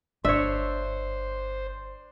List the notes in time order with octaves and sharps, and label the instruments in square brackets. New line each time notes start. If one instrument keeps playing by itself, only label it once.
[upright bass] G1 [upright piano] D4 [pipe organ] C5 [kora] C#5 E5